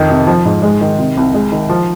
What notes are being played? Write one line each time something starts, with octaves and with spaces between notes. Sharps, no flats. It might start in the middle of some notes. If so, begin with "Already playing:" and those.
Already playing: F2 D#3
C3
F3
G#2
G#3
D#3
C3
C2
G#3
D#3
F3